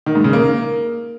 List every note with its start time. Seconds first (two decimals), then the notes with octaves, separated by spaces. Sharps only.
0.06 D#3
0.15 G#2
0.24 C#3
0.33 A#3